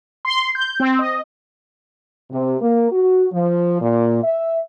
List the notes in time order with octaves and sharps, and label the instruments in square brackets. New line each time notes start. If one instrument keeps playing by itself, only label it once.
[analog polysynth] C6
G6
C4
D#5
[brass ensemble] C3
A#3
F#4
F3
A#2
E5